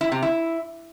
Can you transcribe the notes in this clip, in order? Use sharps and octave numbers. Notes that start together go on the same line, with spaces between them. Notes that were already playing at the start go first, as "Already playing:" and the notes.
E4
C3
E4